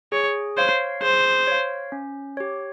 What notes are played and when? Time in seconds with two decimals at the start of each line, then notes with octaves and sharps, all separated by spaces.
0.12 G#4 C#5
0.57 C5 C#5 F5
1.02 G#4 C5
1.47 C#5 F5
1.92 C#4
2.37 G4 C#5